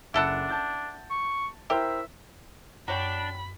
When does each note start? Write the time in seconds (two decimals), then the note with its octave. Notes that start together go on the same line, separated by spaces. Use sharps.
0.14 F#1 D4 E4 A4 F#5 E7
0.49 A5 G6 A6
1.10 C#6
1.70 E4 G4 A#4 C5 E5
2.88 F#2 D4 F#4 C#5 G5 B5